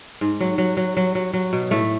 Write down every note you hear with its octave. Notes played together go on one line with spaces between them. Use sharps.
G#2
F#3
F#3
F#3
F#3
F#3
F#3
B2
A2 A3